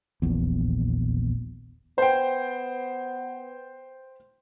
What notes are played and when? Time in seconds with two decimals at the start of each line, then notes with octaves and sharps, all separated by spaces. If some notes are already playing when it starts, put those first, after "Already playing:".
0.22 D#1 A#1 E2
1.98 B3 C5 G5